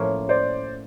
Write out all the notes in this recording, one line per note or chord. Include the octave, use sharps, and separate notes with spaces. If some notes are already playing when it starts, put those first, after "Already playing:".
Already playing: A2 F3 A#3 C#4
C5 D5